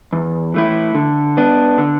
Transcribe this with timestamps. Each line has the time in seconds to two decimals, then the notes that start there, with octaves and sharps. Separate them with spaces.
0.13 E2
0.54 E3 A3 E4
0.95 D3
1.37 B3 D4
1.78 D3